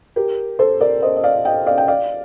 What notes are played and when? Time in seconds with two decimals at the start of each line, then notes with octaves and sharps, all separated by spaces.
0.16 G4 A#4
0.59 A4 C5
0.81 A#4 D5
1.02 C5 D#5
1.16 D#5
1.24 D5 F5
1.45 D#5 G5
1.66 D5 F5
1.78 G5
1.88 D5 F5